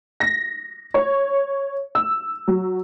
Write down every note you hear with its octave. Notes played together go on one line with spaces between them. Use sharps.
A#6
C#5
E6
F#3